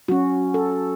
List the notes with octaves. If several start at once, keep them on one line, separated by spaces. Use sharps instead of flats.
F#3 C#4 F#4
A4